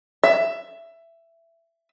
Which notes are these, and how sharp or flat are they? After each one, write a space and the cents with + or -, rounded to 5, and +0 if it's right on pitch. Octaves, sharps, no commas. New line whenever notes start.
E5 +15